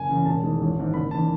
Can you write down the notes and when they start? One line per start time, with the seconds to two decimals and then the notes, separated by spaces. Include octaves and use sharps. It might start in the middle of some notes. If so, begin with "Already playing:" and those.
Already playing: F#1 G#5
0.09 E2 C#3
0.26 E1 A5
0.42 E2 D#3 G#3
0.60 A1
0.77 G#2 D#3
0.94 F#1 B5
1.11 E2 D#3 A5